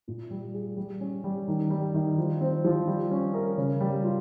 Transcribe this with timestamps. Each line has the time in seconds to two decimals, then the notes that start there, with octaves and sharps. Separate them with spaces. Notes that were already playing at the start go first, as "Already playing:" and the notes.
0.08 A#2
0.31 G3
0.54 G#4
0.77 G3
1.00 C#4
1.24 G3
1.48 D#3
1.70 G3
1.94 D#3
2.18 F3
2.41 C4
2.64 F3
2.87 G3
3.11 C#4
3.34 A#4
3.57 C#3
3.80 G3
4.04 F4